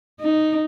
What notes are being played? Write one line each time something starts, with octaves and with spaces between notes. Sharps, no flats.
D#4